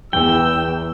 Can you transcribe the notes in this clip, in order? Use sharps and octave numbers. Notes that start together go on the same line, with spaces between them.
E2 G5 E6